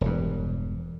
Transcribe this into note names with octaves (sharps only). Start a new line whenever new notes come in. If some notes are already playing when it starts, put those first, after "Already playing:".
E1 G2